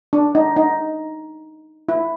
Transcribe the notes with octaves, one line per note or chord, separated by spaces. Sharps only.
D4
D#4
D#4
E4